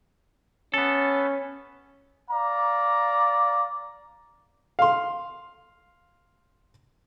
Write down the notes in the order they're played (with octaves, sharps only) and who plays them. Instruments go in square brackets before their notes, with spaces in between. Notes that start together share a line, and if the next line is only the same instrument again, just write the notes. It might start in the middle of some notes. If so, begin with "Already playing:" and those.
[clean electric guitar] B3 A4 [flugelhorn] C#4
[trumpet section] D5 F5 A#5
[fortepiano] F5 C6